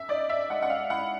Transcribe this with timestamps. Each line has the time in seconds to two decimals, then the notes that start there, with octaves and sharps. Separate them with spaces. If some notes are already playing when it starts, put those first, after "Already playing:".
Already playing: E5
0.08 D#4 D5
0.29 E5
0.50 G#3 F#5
0.62 F#5
0.70 F5
0.90 E4 F#5